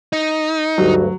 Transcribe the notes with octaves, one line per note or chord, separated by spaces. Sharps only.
D#4
D2 G2 F#3